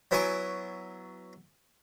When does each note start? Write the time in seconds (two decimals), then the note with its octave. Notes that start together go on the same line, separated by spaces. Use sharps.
0.11 F#3 B3 E4 G#5 C#6 D6